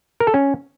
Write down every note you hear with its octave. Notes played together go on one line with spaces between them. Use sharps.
A#4
A4
C#4